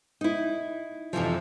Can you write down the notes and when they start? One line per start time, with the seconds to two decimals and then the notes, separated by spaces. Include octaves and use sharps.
0.21 D#4 E4
1.13 F2 C3 E3 F3